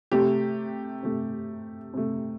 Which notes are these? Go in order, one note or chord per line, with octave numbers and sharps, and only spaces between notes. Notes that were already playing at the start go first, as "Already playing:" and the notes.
C3 A3 G4
C3 A3
C3 A3